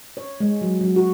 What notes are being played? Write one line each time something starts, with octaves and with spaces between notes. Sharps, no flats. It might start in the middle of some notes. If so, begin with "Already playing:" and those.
C#5
G#3
F#3
F#3
F#4